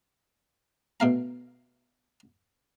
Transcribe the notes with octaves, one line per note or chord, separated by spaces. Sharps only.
B2 A3 F5 A#5